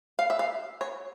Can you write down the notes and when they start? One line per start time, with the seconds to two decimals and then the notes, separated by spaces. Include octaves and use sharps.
0.19 F5
0.30 E5
0.39 F5
0.81 C#5